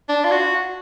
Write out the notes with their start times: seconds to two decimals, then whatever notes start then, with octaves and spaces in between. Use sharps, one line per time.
0.09 D4
0.25 F4
0.31 F#4